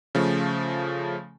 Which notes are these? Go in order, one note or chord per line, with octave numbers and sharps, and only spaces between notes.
C#3 F3 A3